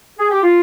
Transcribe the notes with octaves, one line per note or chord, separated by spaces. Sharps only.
G#4
G4
F4